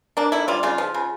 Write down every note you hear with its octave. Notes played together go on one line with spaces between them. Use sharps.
A#3 D4
D3 E4
G3 F4
C#3 F4
F3
C#3